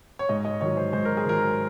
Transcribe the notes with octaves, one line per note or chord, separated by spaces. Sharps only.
C#5
G#2 D#5
D#5
D#3 F#3 C#5
C5
G#2 C5
A#4
G#4
D#3 F#3 A#4